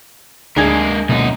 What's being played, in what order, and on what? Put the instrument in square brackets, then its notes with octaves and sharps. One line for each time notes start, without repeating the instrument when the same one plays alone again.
[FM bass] D2 [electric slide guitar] G#3 A#3 A#4 [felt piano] D4 G#4 G#6
[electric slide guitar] F#2 D#4 [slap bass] B2 G#3 A#3